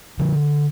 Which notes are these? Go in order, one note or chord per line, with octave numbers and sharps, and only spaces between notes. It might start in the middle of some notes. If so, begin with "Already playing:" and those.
D3 F3